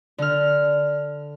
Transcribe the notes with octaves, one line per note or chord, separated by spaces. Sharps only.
D3 F6